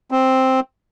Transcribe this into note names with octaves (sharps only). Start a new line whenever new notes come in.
C4